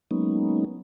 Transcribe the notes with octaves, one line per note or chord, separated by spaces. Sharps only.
F#3 G#3 A#3 B3 C#4 D#4